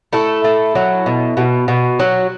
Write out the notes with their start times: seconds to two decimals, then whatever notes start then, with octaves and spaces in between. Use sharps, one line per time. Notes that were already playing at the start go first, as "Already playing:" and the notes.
0.13 A3 E4 A4
0.44 A3
0.75 F#3
1.06 B2
1.37 B2
1.68 B2
2.00 F#3